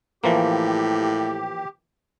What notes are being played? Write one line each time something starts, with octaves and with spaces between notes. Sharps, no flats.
A2 E3 F3 A#3 G4